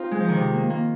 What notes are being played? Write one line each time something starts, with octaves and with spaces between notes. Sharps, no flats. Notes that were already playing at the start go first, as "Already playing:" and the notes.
Already playing: C4 D#4 F4
G#3
F3
D#3
C3
A#3
A#3